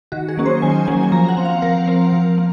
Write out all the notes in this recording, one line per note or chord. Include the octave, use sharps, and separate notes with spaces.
D#3 F#4
G#4
F#3 A#3 C#4
C5
D#3 G#5
F#3 A#3 C#4 G#5
G#5
F3 A#5
F#5
C4
F5
F3 A#4
C4
F3
A#3